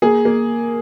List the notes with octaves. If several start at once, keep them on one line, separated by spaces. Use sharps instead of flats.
A#3 G#4
A#3